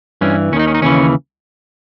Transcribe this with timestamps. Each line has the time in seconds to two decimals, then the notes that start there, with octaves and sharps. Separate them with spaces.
0.21 G2 E3 C#4
0.52 D#2 C#4
0.56 D#3 D#4
0.67 C#4
0.75 D#4
0.82 D#2 C#3 E3 C#4